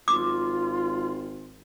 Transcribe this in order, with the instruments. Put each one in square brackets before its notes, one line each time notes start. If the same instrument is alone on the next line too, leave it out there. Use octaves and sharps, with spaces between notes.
[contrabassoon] G#1 [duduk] F4 [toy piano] D6